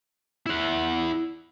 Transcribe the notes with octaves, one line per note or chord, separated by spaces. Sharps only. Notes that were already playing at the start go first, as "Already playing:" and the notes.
E4 F#5